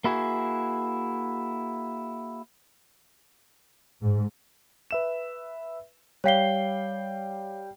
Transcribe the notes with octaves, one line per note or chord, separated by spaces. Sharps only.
A#3 E4 F#4 G#4
G#2
B4 E5 E7
G3 C#5 F5 G5 C7 G7